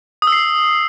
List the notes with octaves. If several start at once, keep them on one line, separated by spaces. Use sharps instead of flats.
D#6
E6
C7